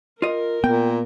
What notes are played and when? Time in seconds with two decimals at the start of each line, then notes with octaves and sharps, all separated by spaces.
0.22 F4 A#4 D#5
0.64 A#2 B3 G5